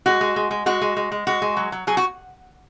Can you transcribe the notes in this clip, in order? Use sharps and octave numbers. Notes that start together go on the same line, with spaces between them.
G#3 F#4
G#3
G#3
G#3
G#3 F#4
G#3
G#3
G#3
G#3 F#4
G#3
F#3
F#3
F#3 G#4
F#4